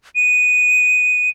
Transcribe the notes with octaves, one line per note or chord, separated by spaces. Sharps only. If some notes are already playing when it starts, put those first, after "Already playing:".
D#7